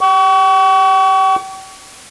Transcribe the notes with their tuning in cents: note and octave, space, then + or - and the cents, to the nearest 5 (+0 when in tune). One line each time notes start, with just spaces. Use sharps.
G5 -40 C#6 +35